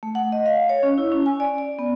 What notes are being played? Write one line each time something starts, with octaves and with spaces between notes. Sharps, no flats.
A3
F#5
D#5
F5
C#5
C#4
E4
C#4
G#5
D5
D5
B3